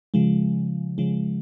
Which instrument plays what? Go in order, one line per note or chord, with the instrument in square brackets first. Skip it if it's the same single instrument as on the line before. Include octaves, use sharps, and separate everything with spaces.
[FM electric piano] C#3 F3 G#3
C#3 F3 G#3